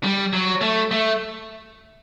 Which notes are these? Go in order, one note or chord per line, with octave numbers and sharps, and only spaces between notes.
G3
F#3
A3
A3